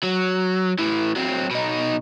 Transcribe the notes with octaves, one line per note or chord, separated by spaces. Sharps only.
F#3
A2 E3
F#3 C4
B2 D#4